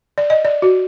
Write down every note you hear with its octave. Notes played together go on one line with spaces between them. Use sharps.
D5
D#5
D5
F#4